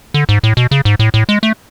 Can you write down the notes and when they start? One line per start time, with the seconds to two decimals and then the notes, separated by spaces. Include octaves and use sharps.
0.14 D3
0.29 G#2
0.44 A2
0.57 B2
0.71 C#3
0.85 G#2
0.99 A2
1.14 A2
1.29 G#3
1.43 A3